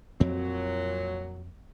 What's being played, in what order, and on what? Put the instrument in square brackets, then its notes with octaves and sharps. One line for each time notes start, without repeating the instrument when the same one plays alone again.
[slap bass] F2 C4 [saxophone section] A#2 F#3